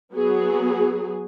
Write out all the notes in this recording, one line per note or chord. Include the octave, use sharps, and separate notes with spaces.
F#3 B3 G#4